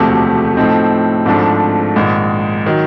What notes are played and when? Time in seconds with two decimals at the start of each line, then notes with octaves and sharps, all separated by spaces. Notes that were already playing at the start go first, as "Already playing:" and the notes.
Already playing: E1 D2 C3 F3 A3
0.57 A2 F3 A3 C4 D#4
1.25 G#1 G#2 F3 A3 D4
1.96 A#1 G#2 D#3
2.66 D#3 F#3